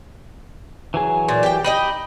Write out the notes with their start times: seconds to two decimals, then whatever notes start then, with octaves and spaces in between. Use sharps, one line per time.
0.94 E3 F#3 G#4
1.28 A#2
1.43 G4 G5
1.64 D#4 G4 D#5 B5